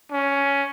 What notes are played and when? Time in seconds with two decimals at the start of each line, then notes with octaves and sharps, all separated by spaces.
0.11 C#4